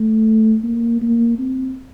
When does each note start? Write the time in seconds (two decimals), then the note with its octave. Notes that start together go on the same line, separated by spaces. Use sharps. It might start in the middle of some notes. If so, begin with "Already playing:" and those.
Already playing: A3
0.63 A#3
1.01 A#3
1.39 C4